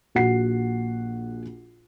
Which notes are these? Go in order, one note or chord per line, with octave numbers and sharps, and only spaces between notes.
A#1 F#4 F#5 C7